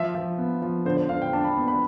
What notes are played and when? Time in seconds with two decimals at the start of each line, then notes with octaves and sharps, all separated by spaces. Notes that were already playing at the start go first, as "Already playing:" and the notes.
Already playing: F3 E5
0.14 F3
0.38 B3
0.62 F3
0.85 D3 C5
0.97 C5
1.09 D3 F5
1.22 G5
1.33 D4 A5
1.44 B5
1.56 B3
1.68 B5